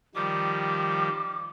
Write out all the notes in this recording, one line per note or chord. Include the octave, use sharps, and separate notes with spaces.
D#3 F3 G3 D6